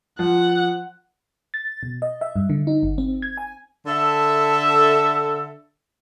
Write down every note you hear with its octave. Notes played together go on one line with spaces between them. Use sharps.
F3 F#5
A6
B2
D#5
E5
G2
D3
D#4
G1
C4
G#6
G#5
D3 A4 E5